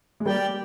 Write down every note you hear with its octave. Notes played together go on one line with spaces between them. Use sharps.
G#3
G3 A#3 G4 D5 G5